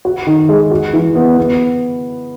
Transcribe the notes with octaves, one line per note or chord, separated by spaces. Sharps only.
F#4
D#3
G#3
F#4
E3
B3
B3